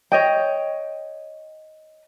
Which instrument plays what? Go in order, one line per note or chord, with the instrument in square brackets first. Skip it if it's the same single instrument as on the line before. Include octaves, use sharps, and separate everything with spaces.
[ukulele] C#5 D#5 G5